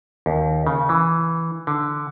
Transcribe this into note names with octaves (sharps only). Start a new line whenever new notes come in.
D#2
C#3
E3
D3